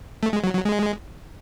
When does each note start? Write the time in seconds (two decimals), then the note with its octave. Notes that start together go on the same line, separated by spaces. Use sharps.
0.23 A3
0.33 G#3
0.44 F#3
0.54 F#3
0.65 G#3